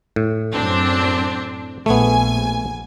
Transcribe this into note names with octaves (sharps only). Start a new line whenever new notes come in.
A2
F#2 C4 D4
A#1 A3 B3 G#5